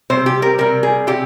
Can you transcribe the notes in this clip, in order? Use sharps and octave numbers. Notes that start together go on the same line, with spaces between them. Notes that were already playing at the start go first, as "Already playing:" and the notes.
C3 G3 C5
G4
A#4
C3 G3 A#4
G#4
C3 G4